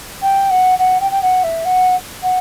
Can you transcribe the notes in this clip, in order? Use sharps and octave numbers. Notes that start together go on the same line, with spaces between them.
G5
F#5
F#5
G5
G5
F#5
E5
F#5
F#5